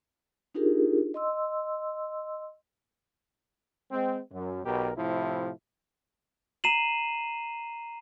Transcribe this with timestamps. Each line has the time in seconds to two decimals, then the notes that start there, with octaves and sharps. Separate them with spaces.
0.55 D4 D#4 F4 G4 G#4 A#4
1.14 D#5 C6 E6
3.91 G#3 C4
4.32 F#2
4.65 B1 B2 G4 A#4
4.97 A2 C3 F3 E4
6.64 A#5 C7 D#7 E7 F#7